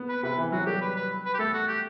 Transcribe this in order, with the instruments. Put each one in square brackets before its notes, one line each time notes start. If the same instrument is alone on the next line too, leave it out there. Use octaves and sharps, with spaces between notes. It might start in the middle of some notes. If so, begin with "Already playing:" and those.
Already playing: [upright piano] B3
[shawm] B4
[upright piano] C3 [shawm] B4
[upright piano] E3
[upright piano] F#3 [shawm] F#4
[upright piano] G3 [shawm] G4
[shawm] B4
B4
B4
G4
[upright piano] A3 [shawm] A4
[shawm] F#4
G4